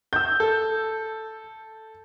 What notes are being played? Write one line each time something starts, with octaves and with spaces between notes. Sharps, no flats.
E6 G6
A4